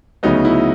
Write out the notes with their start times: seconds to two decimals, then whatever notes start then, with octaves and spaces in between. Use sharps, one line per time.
0.23 D2 C#3 F#3 B3 D#4
0.45 E4